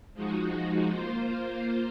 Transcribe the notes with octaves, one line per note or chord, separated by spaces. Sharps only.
F3 G#3 D#4 F#4
A#3 F4 C5